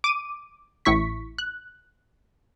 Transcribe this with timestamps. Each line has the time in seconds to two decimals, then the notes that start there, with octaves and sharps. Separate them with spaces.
0.04 D6 D#7
0.85 A1 A2 E4 C#6 B6
1.38 F#6